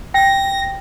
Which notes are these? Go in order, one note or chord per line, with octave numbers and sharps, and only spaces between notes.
G5 A#6